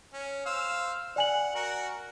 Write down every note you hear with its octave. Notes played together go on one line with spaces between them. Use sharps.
C#4
C5 F5 E6
D5 F#5 G#5 F#7
F#4 A#4 F#5